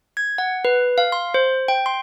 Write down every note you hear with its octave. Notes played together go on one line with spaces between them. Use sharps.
G#6
F#5
B4
F5
C6
C5
G5
C6